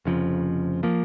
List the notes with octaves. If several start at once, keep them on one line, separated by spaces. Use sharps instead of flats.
F1 F2 C#3 F3
F3 A#3